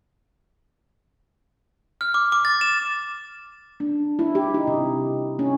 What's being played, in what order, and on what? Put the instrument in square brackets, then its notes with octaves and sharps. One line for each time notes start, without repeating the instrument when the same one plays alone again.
[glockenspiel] F6
D6
D6
A6
E7
[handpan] D4
E4
G4
D#4
C3
C#4